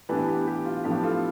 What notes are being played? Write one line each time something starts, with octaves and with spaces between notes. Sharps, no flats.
A2 E3 B3 D4 G4 B4
G4
G4
F4
A2 F3 B3 D4 G4
F4 A4